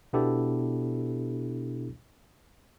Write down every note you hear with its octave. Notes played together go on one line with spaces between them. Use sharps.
B2 B3 D4 E4 G4 A4